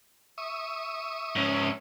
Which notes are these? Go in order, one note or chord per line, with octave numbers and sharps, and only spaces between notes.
E5 C#6 D#6
G#2 C#4